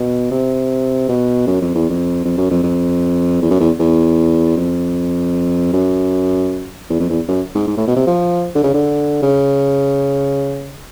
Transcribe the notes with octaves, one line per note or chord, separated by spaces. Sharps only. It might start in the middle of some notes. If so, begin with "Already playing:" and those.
Already playing: B2
C3
B2
F#2
F2
E2
F2
F2
F#2
F2
F2
E2
F#2
E2
E2
F2
F#2
E2
F2
E2
F#2
G#2
G#2
A2
B2
C3
F3
D3
C#3
D3
C#3